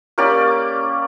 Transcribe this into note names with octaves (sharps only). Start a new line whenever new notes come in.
A#3 C#4 G4 D5